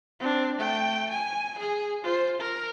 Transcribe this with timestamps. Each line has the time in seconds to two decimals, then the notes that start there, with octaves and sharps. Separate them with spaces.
0.20 C4 D4
0.59 A3 G5
1.10 G#5
1.59 G#4
2.04 F4 C5
2.40 A#4